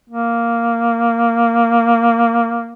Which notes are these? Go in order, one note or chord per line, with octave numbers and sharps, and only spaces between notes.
A#3